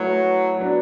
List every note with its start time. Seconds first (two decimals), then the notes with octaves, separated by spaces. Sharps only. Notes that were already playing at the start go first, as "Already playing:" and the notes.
Already playing: F#3 A3 E4 B4
0.58 F#3 B3 D4 F#4